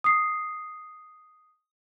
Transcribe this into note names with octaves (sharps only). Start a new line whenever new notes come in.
D#6 C7